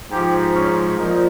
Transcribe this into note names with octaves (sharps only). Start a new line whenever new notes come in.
G#2 F3 G4
C#4
A#2 F3 D#4